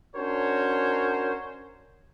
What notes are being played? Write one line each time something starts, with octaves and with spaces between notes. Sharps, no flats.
C#4 D4 F#4 A#4 C5 C#5